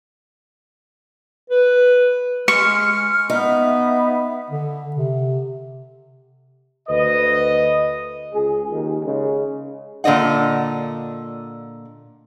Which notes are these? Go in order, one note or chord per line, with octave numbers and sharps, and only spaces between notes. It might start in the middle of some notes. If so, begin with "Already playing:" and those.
B4
G#3 C#6 F6
B3 D#4 E5
D3
C3
D2 B4 D#5
C#2 G#4
D#2 D#3
C#3 G#3
A#2 D3 D5 D#5 F#5